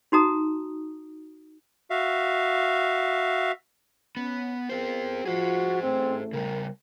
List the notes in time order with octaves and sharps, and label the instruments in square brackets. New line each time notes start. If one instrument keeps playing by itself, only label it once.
[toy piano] D#4 F#4 A#5 D#6
[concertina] F#4 E5 F5
[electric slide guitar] B3 [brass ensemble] C#4
[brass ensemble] B3 G#4 A#4 [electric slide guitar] C4 F4 C5
[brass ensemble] F3 F4 [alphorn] F#4 [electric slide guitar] G#4 C5
[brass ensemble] A1 A3 [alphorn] C4
[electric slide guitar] C#3 G3 [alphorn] A#4